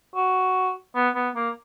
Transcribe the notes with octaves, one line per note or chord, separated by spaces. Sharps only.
F#4
B3
B3
A#3